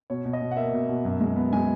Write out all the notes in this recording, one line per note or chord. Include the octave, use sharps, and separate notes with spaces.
B2 C#5
B2
D#5
B2
F#5
A#3 E5
B2
B2
F#2
G#3
B3
G#3 G#5